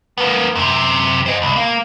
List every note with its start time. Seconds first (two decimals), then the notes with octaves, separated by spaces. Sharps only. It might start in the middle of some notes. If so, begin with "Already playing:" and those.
0.18 A#3 B3
0.55 F#2 C3
1.26 C5 D#5
1.42 C2
1.56 A#3